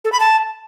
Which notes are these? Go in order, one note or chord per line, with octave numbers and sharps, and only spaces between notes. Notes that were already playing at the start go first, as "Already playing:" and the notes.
A4
B5
A5